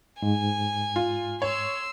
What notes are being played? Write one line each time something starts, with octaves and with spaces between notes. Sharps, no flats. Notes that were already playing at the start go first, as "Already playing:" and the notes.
G#2 G#5
F4
C#5 C6 E6